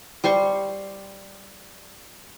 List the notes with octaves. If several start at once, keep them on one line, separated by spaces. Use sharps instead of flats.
G3 C5 C6 C#6